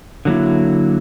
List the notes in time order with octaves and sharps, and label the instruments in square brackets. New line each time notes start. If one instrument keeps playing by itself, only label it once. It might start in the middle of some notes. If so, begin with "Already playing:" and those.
[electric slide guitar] D3 F#3 A#3 E4